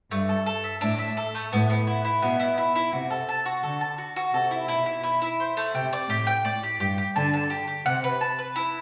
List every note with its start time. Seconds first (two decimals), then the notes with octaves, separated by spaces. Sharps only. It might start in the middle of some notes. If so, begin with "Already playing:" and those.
0.11 G2 A3
0.29 A4
0.46 A4
0.64 E5
0.81 A2 D4
0.99 E5
1.17 A4
1.35 A3
1.52 A2 B3
1.70 B3
1.87 E4
2.05 E4
2.22 B2 B3
2.40 E4
2.58 E4
2.75 E4
2.93 C3 F#4
3.10 A4
3.29 A5
3.45 F#4
3.63 D3 A4
3.81 A5
3.98 F#4
4.16 F#4
4.33 C3 A4
4.51 E4
4.68 B2 E4
4.86 E4
5.04 E4
5.22 E4
5.40 C5
5.57 A3
5.74 C3 G5
5.93 D5
6.09 A2 G4
6.27 G5
6.45 A2 D5
6.63 G4
6.80 G2 G4
6.98 G4
7.15 D3 A5
7.34 A5
7.50 G4
7.68 G4
7.86 C3 F#5
8.04 B4
8.21 A5
8.39 B4
8.56 E4